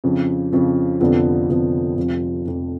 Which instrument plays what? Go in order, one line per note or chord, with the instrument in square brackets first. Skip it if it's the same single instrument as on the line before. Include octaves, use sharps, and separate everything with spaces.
[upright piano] F2 C#3 F3
F2 C#3 F3
F1 F2 D3 F3 B3
F1 F2 D3 F3 B3
F1 F2 F3
F1 F2 F3